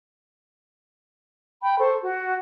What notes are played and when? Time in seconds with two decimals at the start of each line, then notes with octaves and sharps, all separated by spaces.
1.63 G5 B5 G6
1.79 A4 C5 C#6
2.03 F#4